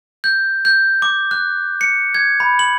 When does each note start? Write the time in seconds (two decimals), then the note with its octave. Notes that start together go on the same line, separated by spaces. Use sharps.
0.24 G6
0.65 G6
1.02 D6
1.31 F#6
1.81 C#7
2.14 G#6
2.40 B5
2.59 F#7